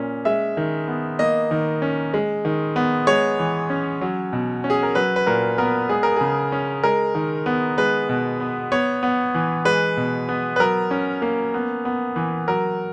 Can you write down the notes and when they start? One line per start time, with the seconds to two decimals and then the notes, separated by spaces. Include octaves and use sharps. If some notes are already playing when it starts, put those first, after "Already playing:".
Already playing: A#2 A#3 C#4
0.25 G#3 E5
0.57 D#3
0.88 B3
1.19 A#3 D#5
1.51 D#3
1.82 C#4
2.14 G#3
2.45 D#3
2.76 B3
3.07 G#3 C#5
3.39 E3
3.70 C#4
4.01 F#3
4.33 B2
4.64 C#4
4.70 G#4
4.83 A#4
4.95 F#3 B4
5.16 B4
5.27 A#2 A#4
5.58 B3 A#4
5.89 G#3 G#4
6.03 A#4
6.16 C#3 G#4
6.52 C#4
6.84 G#3 A#4
7.15 D#3
7.46 B3
7.78 G#3 B4
8.09 B2
8.40 B3
8.72 B3 C#5
9.03 B3
9.35 E3
9.65 G#3 B4
9.97 B2
10.29 B3
10.56 B4
10.59 F#3 A#4
10.91 C#4
11.22 A#3
11.54 B3
11.85 B3
12.16 E3
12.48 F#3 A#4